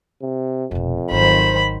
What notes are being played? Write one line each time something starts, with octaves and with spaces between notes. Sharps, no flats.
C3
F1 F2 B2
G#1 D#3 F#3 C5 B5